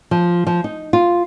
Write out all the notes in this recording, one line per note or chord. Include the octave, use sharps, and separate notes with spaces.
F3
F3
D#4
F4